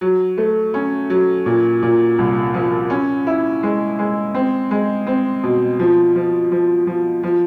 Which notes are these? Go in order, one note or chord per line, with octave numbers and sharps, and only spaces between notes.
F#3
A3
C#4
F#3
A#2
A#2
C2
F3
C#4
E4
G#3
G#3
C4
G#3
C4
B2
F3
F3
F3
F3
F3